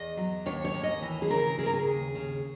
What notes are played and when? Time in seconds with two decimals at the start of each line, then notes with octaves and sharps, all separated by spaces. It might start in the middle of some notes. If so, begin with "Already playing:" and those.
Already playing: E2 D#5
0.17 F#3
0.46 D#2 C#5
0.65 C#5
0.74 D#2
0.84 D#5
1.02 E3
1.22 G#4
1.30 C#3 A#4
1.58 C#3 G#4
1.66 A#4
1.74 G#4
1.87 D#2
2.15 C#3